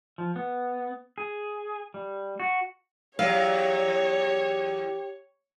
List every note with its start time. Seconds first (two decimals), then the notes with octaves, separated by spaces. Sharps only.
0.18 F3
0.36 B3
1.18 G#4
1.94 G3
2.40 F#4
3.19 E2 F#3 G4 C#5 F5